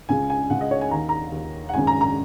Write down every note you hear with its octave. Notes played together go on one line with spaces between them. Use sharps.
C#2 C#3 G#5
G#5
C#2 C#3 F#5
D#5
C#5
G#5
D#2 D#3 A#5
A#5
D#2 D#3
F#5
G#1 F#2 C#3 G#5
A#5
A#5